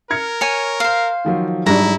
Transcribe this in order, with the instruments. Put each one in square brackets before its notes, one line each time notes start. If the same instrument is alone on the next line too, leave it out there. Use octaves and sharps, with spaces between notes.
[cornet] A#4 [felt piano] F6 G#6 C#7
[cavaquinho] C#5 G#5
C5 F5
[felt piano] D#3 F3 F#3
[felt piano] G#2 F#3 [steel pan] G3 D4 [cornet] E4 [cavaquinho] A#5